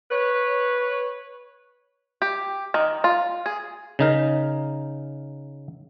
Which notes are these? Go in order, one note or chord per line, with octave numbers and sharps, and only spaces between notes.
B4 C#5
G4
D#3
F4
G#4
C#3 D#4 A#4